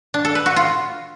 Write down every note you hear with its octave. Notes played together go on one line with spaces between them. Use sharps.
D4
A4
B4
F#4
F4